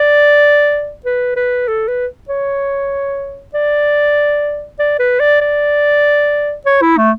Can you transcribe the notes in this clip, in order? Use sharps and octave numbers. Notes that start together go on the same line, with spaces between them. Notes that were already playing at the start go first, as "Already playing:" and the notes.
Already playing: D5
B4
B4
A4
B4
C#5
D5
D5
B4
D5
D5
C#5
E4
A3